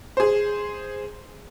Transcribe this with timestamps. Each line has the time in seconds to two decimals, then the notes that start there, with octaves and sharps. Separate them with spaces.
0.17 G#4 C5